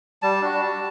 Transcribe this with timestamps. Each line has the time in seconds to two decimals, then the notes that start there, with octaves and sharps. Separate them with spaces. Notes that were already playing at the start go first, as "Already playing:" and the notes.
0.22 G3 A5
0.42 D4 F#4
0.61 G3